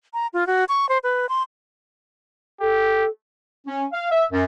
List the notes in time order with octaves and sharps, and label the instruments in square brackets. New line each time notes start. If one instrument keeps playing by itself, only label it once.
[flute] A#5
F4
F#4
C#6
C5
B4
C6
[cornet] G4 [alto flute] A4
[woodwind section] C#4
F5
E5
F#2